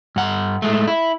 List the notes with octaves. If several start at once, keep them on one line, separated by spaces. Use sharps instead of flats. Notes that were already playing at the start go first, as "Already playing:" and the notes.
G2 F#5
A2 G#3 A3
E4